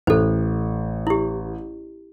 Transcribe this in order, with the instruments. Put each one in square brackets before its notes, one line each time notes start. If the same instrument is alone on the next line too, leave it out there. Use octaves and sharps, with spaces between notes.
[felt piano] A1 [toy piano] A4 C5
[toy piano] E4 G4